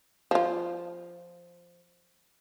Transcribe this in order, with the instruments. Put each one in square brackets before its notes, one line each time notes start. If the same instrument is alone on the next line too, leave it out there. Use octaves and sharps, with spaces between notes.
[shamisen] F3 F4